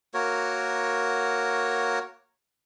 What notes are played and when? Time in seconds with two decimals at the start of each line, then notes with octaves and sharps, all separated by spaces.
0.14 A#3 F#4 A#4 C#5